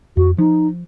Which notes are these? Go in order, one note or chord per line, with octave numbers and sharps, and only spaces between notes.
F2 F#4
F3 D#4